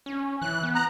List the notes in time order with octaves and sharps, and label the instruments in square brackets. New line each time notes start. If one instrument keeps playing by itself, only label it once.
[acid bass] C#4
[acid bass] E3 [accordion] F#6
[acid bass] B3
[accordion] A#5 F#6